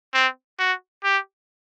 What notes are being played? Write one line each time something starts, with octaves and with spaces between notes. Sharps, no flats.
C4
F#4
G4